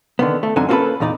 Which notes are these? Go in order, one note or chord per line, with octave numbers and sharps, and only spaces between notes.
D3 D#3 B3
A3
F#2 D3 C4 D#4 G#5
A#3 C#4 F#4 G#4 A4 B4
E2 A#2 D#4 D5